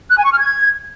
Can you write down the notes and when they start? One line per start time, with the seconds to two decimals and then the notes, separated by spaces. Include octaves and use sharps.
0.10 F#6
0.17 G#5
0.24 C#6
0.32 F6
0.39 G#6